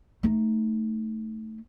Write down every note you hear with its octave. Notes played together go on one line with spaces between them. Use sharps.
A3 D#4